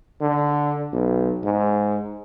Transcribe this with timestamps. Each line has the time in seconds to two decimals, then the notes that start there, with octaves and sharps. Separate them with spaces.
0.21 D3
0.93 B1
1.44 G#2